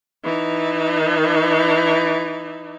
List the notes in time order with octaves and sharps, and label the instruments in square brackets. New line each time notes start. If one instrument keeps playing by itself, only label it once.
[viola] E3 D#4